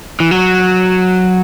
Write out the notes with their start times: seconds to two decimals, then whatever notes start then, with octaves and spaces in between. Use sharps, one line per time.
0.20 E3
0.31 F#3